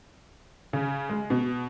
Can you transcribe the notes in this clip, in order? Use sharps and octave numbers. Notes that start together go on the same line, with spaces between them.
C#3
G#3
B2